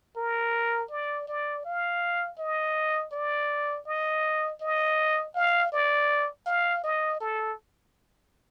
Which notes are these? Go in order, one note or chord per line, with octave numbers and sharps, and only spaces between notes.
A#4
D5
D5
F5
D#5
D5
D#5
D#5
F5
D5
F5
D#5
A4